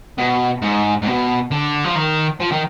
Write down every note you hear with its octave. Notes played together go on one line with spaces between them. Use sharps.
B2
G#2
G#2
B2
D3
F3
D#3
F3
D#3